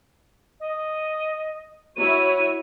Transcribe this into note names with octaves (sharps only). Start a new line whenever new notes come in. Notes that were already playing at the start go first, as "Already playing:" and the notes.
D#5
E4 F#4 C#5 D#7